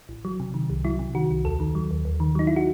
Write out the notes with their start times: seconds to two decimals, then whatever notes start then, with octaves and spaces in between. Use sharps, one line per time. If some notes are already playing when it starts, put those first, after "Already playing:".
0.09 A1
0.25 F#3
0.40 C3
0.54 D#3
0.70 C2
0.84 F#3 E4
0.99 C3
1.15 D#3 F#4
1.31 C2
1.45 D#2 A4
1.60 D#3
1.75 F#3
1.91 D#2
2.05 D#2
2.20 D#3
2.35 F#3 D#4
2.47 E4
2.56 F#4